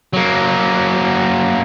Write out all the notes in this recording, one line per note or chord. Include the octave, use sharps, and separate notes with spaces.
F#3 A#3